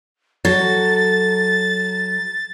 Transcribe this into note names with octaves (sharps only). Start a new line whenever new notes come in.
F#3 A4 A6